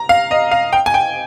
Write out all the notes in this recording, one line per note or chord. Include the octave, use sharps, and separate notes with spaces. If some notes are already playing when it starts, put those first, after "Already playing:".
Already playing: A#5
F5
D#5
F5
G5
G#5
G5